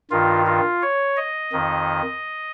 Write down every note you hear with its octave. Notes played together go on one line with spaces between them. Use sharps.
G2 D#3 F4
F4
C#5
D#5
F2 D#3